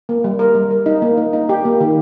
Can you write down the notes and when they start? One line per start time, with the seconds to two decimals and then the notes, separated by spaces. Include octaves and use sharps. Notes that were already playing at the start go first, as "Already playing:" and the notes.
0.09 A#3
0.24 G3
0.39 A#4
0.55 G3
0.71 A#4
0.86 D#4
1.02 A#3
1.17 D#4
1.33 D#4
1.49 G4
1.65 A#3
1.81 D#3